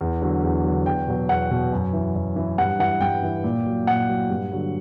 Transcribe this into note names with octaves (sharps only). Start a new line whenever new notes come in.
E2
D3 F#3
E2
D3 F#3
E2 G5
B2 F#3
E2 F#5
B2 F#3
F#2
E3
F#2
E3
G2 F#5
E3 F#5
G2 G5
E3
A#2
F#3
A#2 F#5
F#3
G2
D3 F#3